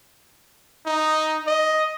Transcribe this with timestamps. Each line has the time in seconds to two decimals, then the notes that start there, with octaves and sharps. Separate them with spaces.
0.86 D#4
1.47 D#5